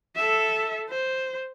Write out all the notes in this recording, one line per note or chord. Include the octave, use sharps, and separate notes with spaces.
A4 E5
C5